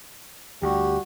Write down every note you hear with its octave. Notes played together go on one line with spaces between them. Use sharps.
D2 G3 F#4 G4